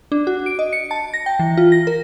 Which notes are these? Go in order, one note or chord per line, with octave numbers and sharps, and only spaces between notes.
D4
F#4
D7
D#5
C#7
A5
A#6
G5
E3
F4
A#6
A#4